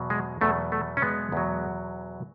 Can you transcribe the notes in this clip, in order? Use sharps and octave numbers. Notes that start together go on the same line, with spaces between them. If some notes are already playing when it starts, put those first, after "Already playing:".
Already playing: E2 B2 F#3
G#3
E2 B2 F#3 A3
A3
C#4
G#3 B3
E2 B2 F#3